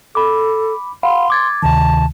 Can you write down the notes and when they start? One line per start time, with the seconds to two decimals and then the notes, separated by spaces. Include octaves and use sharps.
0.15 A4 B5 D6
1.03 F5 F#5 B5 C6
1.30 D6 G#6 A6
1.63 D2 C3 D#3 A5